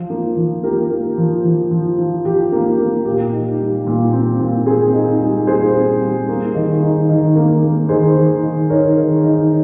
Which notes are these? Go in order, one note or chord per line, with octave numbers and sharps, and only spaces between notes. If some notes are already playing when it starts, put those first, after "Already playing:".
Already playing: F3
A#3
F3
A#3 G4 A#4
A#3
F3
F3
F3
F3
F3 G4
A#3
A#3
A#2 G4
D#4
G3
A#2
C4
A#2
C4 G#4
D#4
G3
A#2 G#4 C5
C4
G3
A#3
D#3
D#4
D#3
A#3
A#3
D#3 G#4 C5
D#3
D#3
D#4 A#4 C#5
D#3
D#4